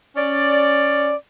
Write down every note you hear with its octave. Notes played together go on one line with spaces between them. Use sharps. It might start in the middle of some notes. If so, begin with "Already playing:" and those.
C#4 D5